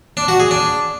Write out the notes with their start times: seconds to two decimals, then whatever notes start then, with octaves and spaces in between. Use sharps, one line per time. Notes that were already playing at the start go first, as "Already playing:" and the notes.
0.17 D4
0.28 F#4
0.40 G#4
0.51 D4